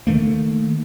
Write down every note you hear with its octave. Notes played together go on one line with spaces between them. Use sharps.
D#3 A3 A#3